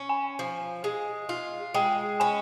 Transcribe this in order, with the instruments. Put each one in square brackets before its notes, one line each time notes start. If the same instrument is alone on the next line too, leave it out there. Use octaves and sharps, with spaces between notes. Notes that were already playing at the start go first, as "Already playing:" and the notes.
Already playing: [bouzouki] C#4
[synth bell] G#5
[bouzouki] F3
G#3
F4
[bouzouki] G#3 [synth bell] G5
[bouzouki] C#4 [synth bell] G#5